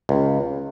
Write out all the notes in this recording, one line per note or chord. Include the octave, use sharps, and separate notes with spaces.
C#2